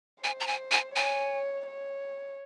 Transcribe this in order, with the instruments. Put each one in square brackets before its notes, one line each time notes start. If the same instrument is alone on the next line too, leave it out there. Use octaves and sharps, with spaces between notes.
[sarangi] C5 [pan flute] G#5
[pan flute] A#5
G#5
G#5
[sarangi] C#5 [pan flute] G#5
[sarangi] C#5